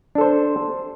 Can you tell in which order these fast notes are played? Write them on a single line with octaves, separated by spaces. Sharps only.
D4 A4 C5